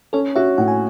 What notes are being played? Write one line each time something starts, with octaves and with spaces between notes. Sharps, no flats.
C#4 A4 C#5
F#4 C#5 E5
A2 F#5
G#5